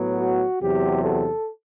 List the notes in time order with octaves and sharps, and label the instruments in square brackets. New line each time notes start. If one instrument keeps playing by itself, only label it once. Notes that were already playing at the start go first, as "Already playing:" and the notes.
Already playing: [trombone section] A2 F#3 B3
F#4
E2 C3 F#3 G4
A4